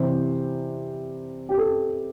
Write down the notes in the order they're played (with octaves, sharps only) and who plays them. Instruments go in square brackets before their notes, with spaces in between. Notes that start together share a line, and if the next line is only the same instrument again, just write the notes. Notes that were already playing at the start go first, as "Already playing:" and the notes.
Already playing: [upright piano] C3 E3 G3 C5
G4
A4